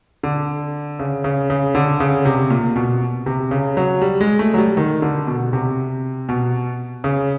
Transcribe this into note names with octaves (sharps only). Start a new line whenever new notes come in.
D3
C#3
C#3
C#3
D3
C#3
C3
A#2
B2
C3
C#3
F#3
G3
G#3
A3
F#3
G3
D#3
D3
B2
C3
B2
C#3